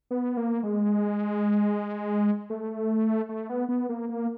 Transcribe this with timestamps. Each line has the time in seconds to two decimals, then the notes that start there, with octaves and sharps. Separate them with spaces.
0.11 B3
0.37 A#3
0.63 G#3
2.50 A3
3.29 A3
3.49 B3
3.69 B3
3.89 A#3
4.09 A#3